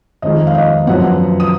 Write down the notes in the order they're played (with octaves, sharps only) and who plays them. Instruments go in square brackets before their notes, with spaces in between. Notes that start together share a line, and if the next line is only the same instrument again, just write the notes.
[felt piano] F2 D#3 G#3 D#5
F5
D#5
F#2 F3 B3 F#5
D#6